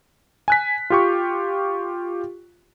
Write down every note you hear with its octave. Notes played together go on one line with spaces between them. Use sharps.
G#5 F#6 B6
F4 G4 C#6